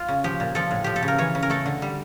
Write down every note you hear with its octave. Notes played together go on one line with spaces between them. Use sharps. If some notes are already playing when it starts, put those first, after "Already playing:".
Already playing: F4
C#3
F3 G4
A#2
F3 A4
A2
F3 G4
A4
C#3
A#4
E3 C#5
C#3
A#4
A3 A4
D3
G3